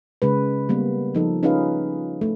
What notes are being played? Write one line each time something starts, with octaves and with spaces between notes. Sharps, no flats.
C#3 G#3 B4
G3 A#3 B3
F3 D#4 A4
C#4 D#4 F4 G#4 B4 F5
A3